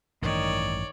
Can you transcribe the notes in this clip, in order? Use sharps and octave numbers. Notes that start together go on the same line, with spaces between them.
A1 G2 D#3 C#5 D5